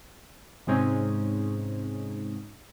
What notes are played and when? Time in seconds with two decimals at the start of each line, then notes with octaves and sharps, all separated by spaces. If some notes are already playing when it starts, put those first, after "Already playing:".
0.67 G#2 C3 G#3 C4 C#4 D#4